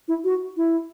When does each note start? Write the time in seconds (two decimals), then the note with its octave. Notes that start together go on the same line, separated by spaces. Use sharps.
0.08 E4
0.24 F#4
0.57 E4